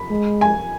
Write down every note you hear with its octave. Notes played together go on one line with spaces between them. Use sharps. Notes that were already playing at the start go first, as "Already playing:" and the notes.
Already playing: B5
G#3
G#5